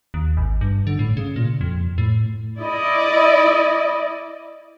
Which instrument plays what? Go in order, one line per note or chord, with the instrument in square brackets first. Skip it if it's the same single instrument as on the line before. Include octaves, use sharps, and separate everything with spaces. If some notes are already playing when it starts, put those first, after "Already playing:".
[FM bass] D#2
G#1
G2
D3
A2
C#3
A#2
F2
A2
[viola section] E4 D5 D#5